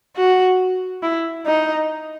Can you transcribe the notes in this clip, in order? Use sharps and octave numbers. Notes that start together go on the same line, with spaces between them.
F#4
E4
D#4